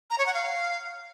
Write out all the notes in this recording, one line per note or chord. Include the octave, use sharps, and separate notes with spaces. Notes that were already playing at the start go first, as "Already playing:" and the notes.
A#5
C#5
F#5
F5